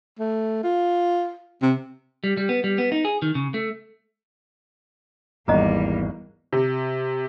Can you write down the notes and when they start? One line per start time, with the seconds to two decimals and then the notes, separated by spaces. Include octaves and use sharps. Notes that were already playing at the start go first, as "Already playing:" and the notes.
0.19 A3
0.64 F4
1.62 C3
2.24 G3
2.37 G3
2.49 B3
2.64 G3
2.78 B3
2.92 D#4
3.05 G#4
3.22 D#3
3.35 C#3
3.54 A3
5.48 G#1 E2 G3 A#3 C#4 D#5 A#5
6.53 C3